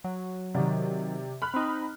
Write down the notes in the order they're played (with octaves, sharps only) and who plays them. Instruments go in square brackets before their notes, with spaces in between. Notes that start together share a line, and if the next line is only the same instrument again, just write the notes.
[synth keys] F#3
[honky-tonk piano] C3 D5 [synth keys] D#3 F#3
[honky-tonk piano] B5 F6 F#6
[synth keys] C4 D#4